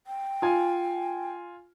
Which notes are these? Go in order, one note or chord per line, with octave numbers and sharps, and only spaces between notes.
G5
F4 G#5